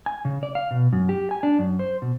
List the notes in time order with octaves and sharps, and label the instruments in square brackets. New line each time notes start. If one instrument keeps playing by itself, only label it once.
[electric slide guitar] G#5
C#3
D5
F5
B2
F#2
G4
G#5
D4
F#2
C5
B2